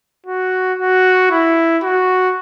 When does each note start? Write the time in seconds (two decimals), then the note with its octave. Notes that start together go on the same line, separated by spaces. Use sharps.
0.26 F#4
0.79 F#4
1.31 E4
1.83 F#4